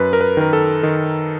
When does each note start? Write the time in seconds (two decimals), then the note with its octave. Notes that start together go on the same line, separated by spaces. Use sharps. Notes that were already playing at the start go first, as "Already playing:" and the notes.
Already playing: F#2 B4
0.13 A#4
0.21 B4
0.37 D#3 A#4
0.53 A4
0.83 D#3